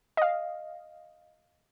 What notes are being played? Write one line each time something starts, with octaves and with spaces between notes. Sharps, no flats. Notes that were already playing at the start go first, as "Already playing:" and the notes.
D#5 F5